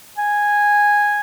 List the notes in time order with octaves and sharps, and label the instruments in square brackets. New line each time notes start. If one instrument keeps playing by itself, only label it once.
[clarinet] G#5